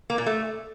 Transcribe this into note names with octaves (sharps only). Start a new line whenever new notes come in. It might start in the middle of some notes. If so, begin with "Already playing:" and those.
A#3
A#2
A3